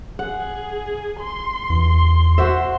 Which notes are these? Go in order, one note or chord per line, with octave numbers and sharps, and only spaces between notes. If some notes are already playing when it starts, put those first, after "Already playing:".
G#4 F#5
C6
E2
F#4 C5 E5